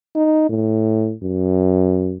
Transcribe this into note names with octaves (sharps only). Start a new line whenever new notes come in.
D#4
A2
F#2